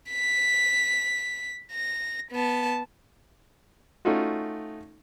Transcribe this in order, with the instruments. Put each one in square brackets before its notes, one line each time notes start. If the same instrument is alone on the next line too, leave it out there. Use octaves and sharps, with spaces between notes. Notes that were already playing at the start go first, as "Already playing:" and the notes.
[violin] B6
A#6
B3 A5
[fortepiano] A3 C#4 D#4 F4 F#4